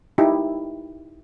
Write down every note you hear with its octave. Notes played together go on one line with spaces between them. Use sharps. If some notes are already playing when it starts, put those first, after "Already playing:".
D#4 E4 G4